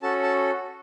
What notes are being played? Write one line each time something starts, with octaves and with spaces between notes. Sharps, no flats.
C#4 F#4 A4 A5
A5